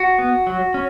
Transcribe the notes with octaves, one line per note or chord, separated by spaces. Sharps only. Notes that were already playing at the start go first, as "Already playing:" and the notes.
Already playing: F#4
B3
F#3
C#4